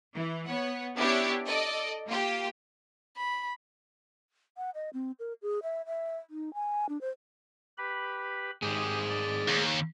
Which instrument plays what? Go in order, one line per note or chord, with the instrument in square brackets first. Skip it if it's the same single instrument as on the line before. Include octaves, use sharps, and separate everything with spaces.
[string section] E3
B3 C#5 F#5
B3 C#4 D4 E4 G4 C#5
A4 D5 D#5
A#3 F4 G4
[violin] B5
[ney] F#5
D#5
C4
A#4
G#4
E5
E5
D#4
G#5
D4
C5
[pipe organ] G4 B4 B5
[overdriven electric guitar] G#2 D#3 [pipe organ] G4 D#6 [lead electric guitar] G#4 C5
[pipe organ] D5
[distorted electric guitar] D#2